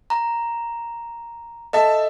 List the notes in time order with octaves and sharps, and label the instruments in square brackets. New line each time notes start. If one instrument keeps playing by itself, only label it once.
[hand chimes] A#5
[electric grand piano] A4 E5 A5 [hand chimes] D#5